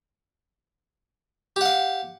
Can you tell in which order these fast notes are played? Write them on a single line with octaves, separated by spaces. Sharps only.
G4 F#5 F5